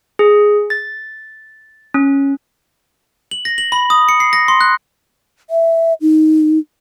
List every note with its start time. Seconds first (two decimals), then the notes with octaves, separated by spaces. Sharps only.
0.19 G#4
0.70 A6
1.94 C#4
3.31 F#7
3.45 A#6
3.58 F#7
3.72 B5
3.90 D#6
4.09 C#7
4.20 C7
4.33 A#6
4.48 C6
4.61 F#6
5.50 E5
6.01 D#4